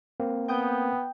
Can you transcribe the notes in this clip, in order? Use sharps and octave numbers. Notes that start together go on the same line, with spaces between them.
A#3 C4
B3 G5 D#6 G6